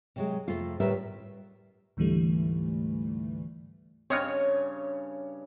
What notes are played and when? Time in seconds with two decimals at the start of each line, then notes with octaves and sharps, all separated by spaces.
0.16 C3 F#3 G#3
0.48 F2 C3 A3 F4
0.80 D2 A2 G3 A#4 B4 E5
1.97 D2 G#2 D3 E3 G3 A3
4.10 G2 C#3 C4 C#5 D#5 F6